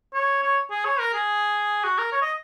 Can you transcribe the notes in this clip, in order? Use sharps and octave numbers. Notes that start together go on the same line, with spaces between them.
C#5
C#5
G#4
C#5
A#4
G#4
F#4
A#4
C#5
D#5